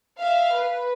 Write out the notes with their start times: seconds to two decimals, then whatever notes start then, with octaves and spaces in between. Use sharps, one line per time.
0.19 E5 F5
0.53 B4